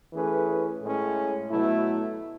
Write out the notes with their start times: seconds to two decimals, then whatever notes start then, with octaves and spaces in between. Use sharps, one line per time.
0.12 E3 A3 C#4 G#4 B4
0.82 A2 G#3 C#4
1.50 B2 F#3 A3 E4